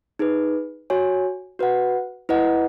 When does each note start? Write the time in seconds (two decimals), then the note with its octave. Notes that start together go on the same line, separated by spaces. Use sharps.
0.19 D#4 G#4 B4
0.90 F#4 C#5 G#5
1.59 F#4 B4 F#5
2.29 E4 B4 D#5 F#5